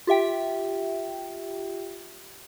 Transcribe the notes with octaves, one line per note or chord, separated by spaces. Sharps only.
F4 G4 E5 G5